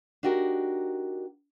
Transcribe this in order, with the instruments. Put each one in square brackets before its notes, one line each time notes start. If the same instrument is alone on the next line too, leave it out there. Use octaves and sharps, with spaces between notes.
[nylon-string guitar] D4 D#4 F#4 G4 A#4